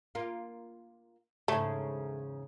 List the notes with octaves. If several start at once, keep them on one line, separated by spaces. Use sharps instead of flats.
A#3 F4
E2 G#2 C#3 A3